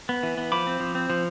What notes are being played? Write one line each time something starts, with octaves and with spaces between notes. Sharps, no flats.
B3
E3
B3
F3 B5 D6
C4
F3
C4
F3